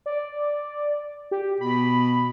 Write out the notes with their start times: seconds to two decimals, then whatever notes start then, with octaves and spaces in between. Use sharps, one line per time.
0.06 D5
1.31 G4
1.61 B2 B5